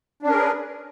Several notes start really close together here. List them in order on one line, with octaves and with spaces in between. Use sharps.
D4 C#4 A#4 G#4 B4